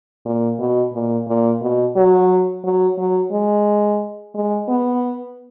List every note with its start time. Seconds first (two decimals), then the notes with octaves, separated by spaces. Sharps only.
0.25 A#2
0.59 B2
0.94 A#2
1.27 A#2
1.62 B2
1.96 F#3
2.64 F#3
2.98 F#3
3.31 G#3
4.34 G#3
4.68 B3